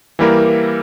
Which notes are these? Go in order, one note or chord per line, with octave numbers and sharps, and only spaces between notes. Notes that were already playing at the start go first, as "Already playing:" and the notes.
E3 G3 A#3 E4 A#4